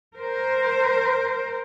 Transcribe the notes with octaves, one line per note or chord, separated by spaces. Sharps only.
A#4 C5